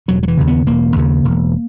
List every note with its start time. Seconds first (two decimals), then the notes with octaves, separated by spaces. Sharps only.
0.08 E1 F#3
0.23 F#3
0.28 E3
0.38 D#2 C#3
0.47 B3
0.66 E1 A#3
0.96 D#2 C#3
1.25 E1